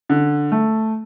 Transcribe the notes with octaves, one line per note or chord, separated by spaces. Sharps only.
D3
A3